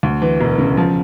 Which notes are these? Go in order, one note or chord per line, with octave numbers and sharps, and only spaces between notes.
D2
E3
E1
C#3
F3